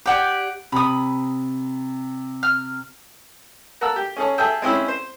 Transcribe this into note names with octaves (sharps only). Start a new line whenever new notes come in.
G4 D5 F#5 G#5 D6
C3 B5 D#6
F6
A#4 F#5 A5 E6
G4
C#4 G#4 A4 C#5
G#4 A4 E5 G5
G#3 C4 C#4 E4
C5